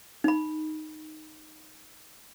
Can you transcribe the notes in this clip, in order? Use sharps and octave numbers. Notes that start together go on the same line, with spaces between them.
D#4 B5